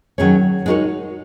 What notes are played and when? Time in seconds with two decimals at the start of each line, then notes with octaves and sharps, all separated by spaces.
0.18 D#3 F#3 C#4 G#4 C#5
0.66 G#3 D#4 F#4 A#4 C#5